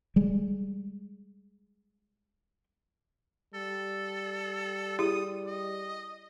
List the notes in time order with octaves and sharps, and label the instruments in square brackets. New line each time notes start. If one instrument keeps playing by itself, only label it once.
[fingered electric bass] G3 G#3
[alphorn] G3 [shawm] A4
[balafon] E4 G4 G#4 [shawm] D#6
[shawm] D#5